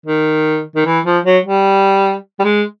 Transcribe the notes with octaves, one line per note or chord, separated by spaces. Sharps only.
D#3
D#3
E3
F3
F#3
G3
G3
G#3